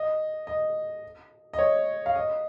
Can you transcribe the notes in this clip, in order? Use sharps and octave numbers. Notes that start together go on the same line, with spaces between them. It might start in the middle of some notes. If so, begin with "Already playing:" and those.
Already playing: D#5
D#5
D#5
C#5
F5
D#5